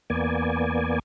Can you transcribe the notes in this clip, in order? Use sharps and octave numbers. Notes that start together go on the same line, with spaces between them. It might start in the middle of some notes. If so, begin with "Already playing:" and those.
E2 A#3 B3 D5 G#5